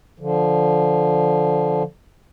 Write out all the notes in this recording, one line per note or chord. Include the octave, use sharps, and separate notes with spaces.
D3 F3